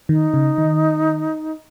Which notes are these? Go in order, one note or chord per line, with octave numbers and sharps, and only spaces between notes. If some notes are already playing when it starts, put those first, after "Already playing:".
D#3 D#4
C#3
D#3